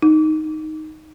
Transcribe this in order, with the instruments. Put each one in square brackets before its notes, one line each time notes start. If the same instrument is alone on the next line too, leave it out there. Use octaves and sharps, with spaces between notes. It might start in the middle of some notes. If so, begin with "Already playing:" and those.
[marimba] D#4